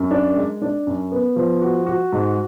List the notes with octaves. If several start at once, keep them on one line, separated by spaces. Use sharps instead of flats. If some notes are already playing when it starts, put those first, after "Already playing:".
Already playing: F#2
D4
G#3
D4
F#2
B3
F3
F#4
F#4
G#2